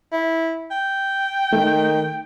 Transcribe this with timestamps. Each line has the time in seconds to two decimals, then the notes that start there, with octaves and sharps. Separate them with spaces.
0.13 E4
0.71 G5
1.53 D#3 A3